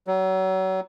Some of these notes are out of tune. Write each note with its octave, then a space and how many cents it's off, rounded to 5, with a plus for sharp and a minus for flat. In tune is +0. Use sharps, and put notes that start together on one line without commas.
F#3 +35